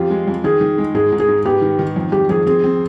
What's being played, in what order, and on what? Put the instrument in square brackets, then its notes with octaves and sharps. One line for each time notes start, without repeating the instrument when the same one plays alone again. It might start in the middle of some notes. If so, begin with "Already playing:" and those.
Already playing: [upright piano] F2 F4 [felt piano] G4
[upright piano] G#3
F2
[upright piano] D#3 [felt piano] G#4
[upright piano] D#3
G#3
[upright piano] G#2 [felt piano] G#4
[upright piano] G#2
[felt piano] G#4
[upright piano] G#2
[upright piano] B3 [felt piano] G4
[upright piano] D#3
D#3
F2
[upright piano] F2 [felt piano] G4
[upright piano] F2 [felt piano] G#4
[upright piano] C4 [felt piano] G#4
[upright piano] C4